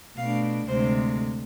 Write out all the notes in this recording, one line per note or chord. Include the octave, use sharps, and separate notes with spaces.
B2 A3 D4 F5
D2 C3 G#3 C5